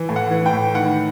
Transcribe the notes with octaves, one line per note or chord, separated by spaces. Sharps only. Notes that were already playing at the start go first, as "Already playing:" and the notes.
Already playing: E3
A2
F#5
E3
G5
A2
D#3 F#5